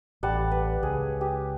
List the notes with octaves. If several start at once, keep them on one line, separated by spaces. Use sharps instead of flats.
A1 G3 F#5 A5
B4
C#2 G#4
G4